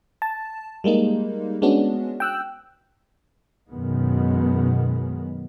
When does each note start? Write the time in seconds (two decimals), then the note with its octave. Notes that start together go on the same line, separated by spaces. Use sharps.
0.22 A5
0.84 G3 G#3 A#3 D#4
1.62 G#3 B3 C#4 D4 F#4
2.20 G5 E6 F#6
3.70 F#2 B2 D#3 G#3 B3